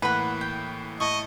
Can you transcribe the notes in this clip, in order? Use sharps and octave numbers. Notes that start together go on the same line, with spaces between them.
A2 E3 A#3 B4 F#5 B5
G5
A2 E4 D#5 A5 C#6